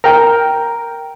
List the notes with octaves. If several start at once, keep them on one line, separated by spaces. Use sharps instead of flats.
A#4 G5